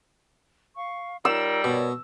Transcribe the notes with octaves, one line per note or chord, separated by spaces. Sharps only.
F5 C#6
G3 D#4 F4 A#4 E6
B2 A#4 C#5 D5